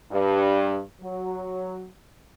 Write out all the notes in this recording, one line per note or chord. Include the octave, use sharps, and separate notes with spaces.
G2
F#3